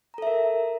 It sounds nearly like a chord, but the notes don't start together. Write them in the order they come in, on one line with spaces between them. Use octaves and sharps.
A#5 A4 E5 A#4